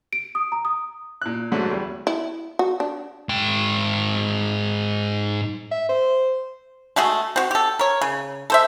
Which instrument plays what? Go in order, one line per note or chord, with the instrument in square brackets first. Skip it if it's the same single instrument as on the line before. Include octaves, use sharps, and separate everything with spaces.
[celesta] D7
D#6
A#5
D#6
[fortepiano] A#2 F#6
G#2 D3 F#3 A3
E2 G3
[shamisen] E4
F#4
D4
[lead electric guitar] G#2 G5
[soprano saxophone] E5
C5
[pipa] G#3 A3 F#4 G#4
C4 F#4
G4 A4
A#4 C#5
C#3
A4 C5 E5